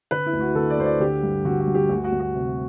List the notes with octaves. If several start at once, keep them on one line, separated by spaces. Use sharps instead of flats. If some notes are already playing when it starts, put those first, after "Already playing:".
D3 B4
E4
D2
F#4
D3 A4
D5
D2 C5
D5
D3 G4
G2
D3 F#4
F#4
G2
G4
D2 F#4
F#4
D2
F#4
C3